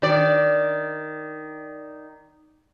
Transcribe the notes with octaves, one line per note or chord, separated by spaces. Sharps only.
D#3 D5